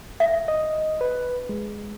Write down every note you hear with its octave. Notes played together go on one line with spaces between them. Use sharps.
E5
D#5
B4
G#3